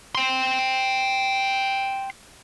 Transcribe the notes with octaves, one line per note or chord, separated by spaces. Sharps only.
G5 C6